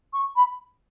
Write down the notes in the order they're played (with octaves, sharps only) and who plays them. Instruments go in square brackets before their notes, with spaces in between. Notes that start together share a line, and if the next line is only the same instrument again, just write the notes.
[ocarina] C#6
B5